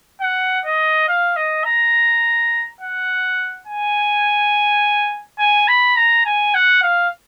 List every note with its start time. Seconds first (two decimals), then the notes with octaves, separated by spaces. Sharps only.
0.21 F#5
0.65 D#5
1.08 F5
1.36 D#5
1.65 A#5
2.81 F#5
3.67 G#5
5.39 G#5
5.68 B5
5.96 A#5
6.25 G#5
6.54 F#5
6.82 F5